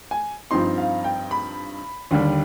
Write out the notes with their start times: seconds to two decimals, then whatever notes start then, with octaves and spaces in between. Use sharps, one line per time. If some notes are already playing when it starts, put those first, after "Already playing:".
0.11 G#5
0.51 G2 F3 C4 D#4 C6
0.78 F5
1.04 G5
1.31 B5
2.11 D#2 D3 G3